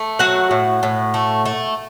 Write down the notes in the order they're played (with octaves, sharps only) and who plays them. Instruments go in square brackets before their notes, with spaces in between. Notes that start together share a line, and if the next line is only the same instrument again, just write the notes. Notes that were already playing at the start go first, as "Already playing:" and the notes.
Already playing: [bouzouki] A3
F#3 F#4 F#5
A2
A2
A3
A3